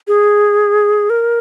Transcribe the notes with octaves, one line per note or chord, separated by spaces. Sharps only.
G#4
A#4